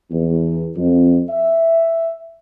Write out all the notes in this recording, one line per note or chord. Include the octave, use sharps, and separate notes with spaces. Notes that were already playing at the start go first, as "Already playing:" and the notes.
E2
F2
E5